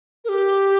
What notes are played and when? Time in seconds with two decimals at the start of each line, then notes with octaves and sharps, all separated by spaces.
0.25 A#4
0.29 G4